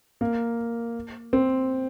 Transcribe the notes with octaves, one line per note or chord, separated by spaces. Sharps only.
A#3
C4